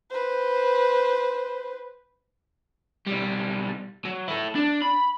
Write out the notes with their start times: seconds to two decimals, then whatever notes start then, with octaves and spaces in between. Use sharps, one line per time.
0.11 B4 C5
3.07 B1 G3
4.05 F#3
4.28 E4 A4
4.55 D4
4.82 B5